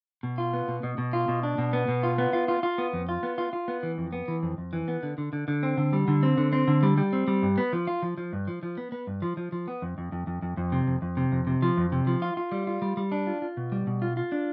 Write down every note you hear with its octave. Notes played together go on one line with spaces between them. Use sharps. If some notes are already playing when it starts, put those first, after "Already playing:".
B2
F4
B3
B2
B2
B2
F4
B2
D4
B2
B3
B2
F4
B3
F4
F4
F4
B3
F2
F4
B3
F4
F4
B3
E3
F2
B3
E3
F2
F2
E3
B3
D3
D3
D3
D3
C4
D3
G3
D3
C4
D3
C4
D3
G3
G3
C4
G3
G2
B3
F3
F4
F3
F3
G2
F3
F3
B3
B3
G2
F3
F3
F3
B3
F2
F2
F2
F2
F2
F2
C3
F2
F2
C3
F2
C3
F3
F2
C3
F3
F4
F4
G3
F4
G3
G3
D4
F4
F4
B2
G3
B2
F4
F4
D4